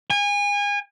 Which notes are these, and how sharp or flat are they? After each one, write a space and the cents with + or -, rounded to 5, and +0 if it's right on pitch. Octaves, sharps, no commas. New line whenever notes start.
G#5 -30